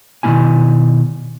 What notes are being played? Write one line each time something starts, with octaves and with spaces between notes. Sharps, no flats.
B2 D#3 G#3 C4 E4 G#5